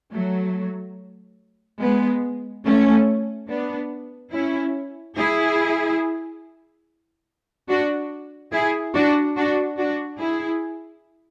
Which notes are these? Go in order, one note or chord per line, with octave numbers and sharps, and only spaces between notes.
F#3 A3
G#3 B3
A3 C#4
B3 D4
C#4 E4
E4 G#4
D4 F#4
E4 G#4
D4 F#4
D4 F#4
D4 F#4
E4 G#4